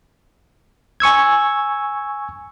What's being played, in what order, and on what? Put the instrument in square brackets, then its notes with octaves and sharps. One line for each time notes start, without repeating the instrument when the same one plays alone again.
[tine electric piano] G#5 C#6 E6 G#6